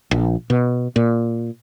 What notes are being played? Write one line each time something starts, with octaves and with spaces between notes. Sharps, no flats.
A#1
B2
A#2